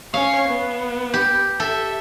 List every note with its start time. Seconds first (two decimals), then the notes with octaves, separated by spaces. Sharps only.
0.14 C#4 C#5 F5
0.48 B3
1.14 G4
1.60 A4 E5